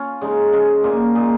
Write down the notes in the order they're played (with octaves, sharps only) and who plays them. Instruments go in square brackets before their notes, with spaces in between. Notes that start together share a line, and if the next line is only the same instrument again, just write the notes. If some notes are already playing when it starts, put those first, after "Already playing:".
Already playing: [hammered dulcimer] C#4 F4
C#3 G#3 D#4
C#3 F3 G#3 F4
A#2 A#3 F4
A#2 G#3 D#4